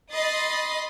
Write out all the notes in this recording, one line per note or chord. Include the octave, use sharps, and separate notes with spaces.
D#5 B5 C6 D#6 A6 C7